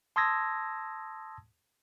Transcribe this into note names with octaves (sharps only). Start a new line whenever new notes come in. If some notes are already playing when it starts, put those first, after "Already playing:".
A5 C6 D#6 E6 G#6 A#6